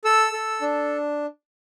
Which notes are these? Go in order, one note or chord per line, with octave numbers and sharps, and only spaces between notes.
A4 E6
A4
D4